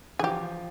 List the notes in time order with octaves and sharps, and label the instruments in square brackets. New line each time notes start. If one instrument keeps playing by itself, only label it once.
[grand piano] E3 [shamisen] G#4
[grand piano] F3 [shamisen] G4